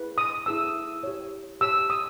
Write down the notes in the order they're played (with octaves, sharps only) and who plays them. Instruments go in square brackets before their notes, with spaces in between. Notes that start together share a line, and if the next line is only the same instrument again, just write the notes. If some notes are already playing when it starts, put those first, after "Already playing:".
Already playing: [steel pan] E4 G#4 B4
D#6
E4 G#4 B4 E6
G4 C#5
G4 C#5 E6
D#6